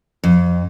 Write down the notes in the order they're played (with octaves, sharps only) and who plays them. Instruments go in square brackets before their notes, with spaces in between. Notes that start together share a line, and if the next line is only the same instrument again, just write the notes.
[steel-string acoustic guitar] F2